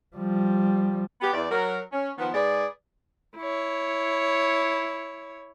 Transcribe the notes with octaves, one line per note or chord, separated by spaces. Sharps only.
F3 G3
B3 G4
E2 D5
F#3 A#4
C#4
D#3 F3 B3
G#2 G#4 B4 D5
E4 C#5